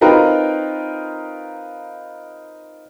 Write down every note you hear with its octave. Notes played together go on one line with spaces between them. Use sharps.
C4 D#4 F4 A#4 B4